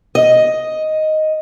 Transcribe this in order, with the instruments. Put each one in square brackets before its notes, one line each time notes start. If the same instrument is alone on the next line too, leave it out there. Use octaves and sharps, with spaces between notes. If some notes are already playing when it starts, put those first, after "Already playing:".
[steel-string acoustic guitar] D#5